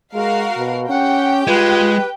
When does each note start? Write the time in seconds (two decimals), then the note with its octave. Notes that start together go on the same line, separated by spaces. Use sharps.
0.14 G#3 F#4 A#4 F5
0.58 B2
0.90 C#4 G4 F#5 G5
1.47 G#3 F4 B4